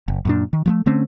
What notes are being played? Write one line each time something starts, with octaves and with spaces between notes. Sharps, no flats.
F#1
F#2 A#2 D4
D#3
F3 G3 A3
D3 A3 C4 C#4